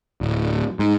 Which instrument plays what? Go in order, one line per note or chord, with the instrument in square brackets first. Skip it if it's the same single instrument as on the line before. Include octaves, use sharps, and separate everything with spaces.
[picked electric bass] D1
G#2